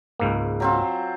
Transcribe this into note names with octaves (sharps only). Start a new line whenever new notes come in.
C#2 G#2 A#3
F#3 C4 F4